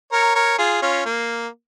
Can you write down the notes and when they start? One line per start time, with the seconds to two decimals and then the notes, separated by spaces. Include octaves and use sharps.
0.12 A#4 C#5
0.35 A#4 C#5
0.58 F4 G#4
0.82 C#4 F4
1.05 A#3